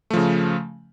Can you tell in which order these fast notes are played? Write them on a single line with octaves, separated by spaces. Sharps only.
A3 F3 C#3